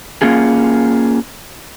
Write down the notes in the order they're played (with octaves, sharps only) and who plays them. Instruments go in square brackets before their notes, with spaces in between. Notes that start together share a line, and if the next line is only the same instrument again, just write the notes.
[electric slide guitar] A#3 C#4 F4 G#4